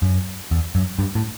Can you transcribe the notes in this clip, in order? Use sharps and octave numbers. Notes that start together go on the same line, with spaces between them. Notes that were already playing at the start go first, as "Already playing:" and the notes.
F#2
E2
F#2
G2
A2